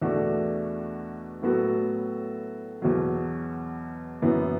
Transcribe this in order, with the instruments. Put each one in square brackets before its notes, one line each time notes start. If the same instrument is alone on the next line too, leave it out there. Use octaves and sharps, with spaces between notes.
[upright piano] E2 B2 A3 D4 F#4
A2 F#3 B3 F#4 A4
E2 B2 F#3
F#2 E3 B3